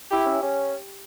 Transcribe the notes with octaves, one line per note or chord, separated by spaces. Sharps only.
E4 G4
C#4
C#4